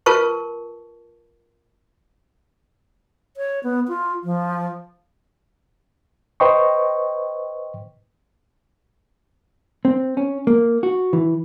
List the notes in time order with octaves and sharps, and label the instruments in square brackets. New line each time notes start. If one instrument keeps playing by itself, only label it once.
[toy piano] F4 A#4 B4 A5 C#6
[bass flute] C#5
B3
F4
F3
[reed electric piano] B4 C5 D#5 G5 C6 C#6
[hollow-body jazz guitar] C4
C#4
A#3
F#4
E3